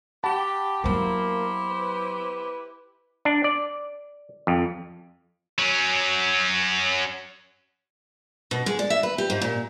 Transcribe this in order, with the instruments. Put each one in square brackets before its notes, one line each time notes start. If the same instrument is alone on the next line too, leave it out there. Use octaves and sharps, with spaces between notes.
[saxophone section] G4 [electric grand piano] F#5 A5 B5
[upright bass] F#3 B3 [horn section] A#3 [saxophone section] E4 G4 C5
[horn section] B4
[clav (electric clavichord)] D4
D5
F2
[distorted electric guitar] F#3 C#4
[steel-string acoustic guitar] B2
G#3
D5
E5
B4
G4
G#2
A#2